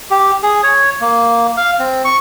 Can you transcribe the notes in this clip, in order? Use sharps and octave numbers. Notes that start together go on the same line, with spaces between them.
G4
G#4
C#5
A#3
F5
C4
C#6